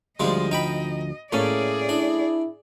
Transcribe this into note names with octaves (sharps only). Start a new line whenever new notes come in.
D2 F3 G3 G#3 F4 D#5
D#4 G5 B5
A2 A3 A#3 C#4 G#4 D5
D4 E4